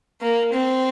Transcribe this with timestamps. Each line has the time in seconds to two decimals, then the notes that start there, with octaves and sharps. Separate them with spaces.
0.22 A#3
0.53 C4